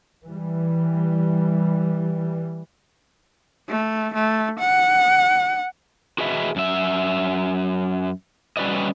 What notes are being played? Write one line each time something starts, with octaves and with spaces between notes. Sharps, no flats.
E3 G3
A3
A3
F#5
F#4 G#4 B4 D#5 E5
F#2 E5
G3 C#4 F#4 B4 D5 D#5